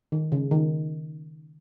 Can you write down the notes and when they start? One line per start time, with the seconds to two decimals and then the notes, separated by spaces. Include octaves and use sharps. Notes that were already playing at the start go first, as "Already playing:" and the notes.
0.12 D#3
0.32 C#3
0.51 D#3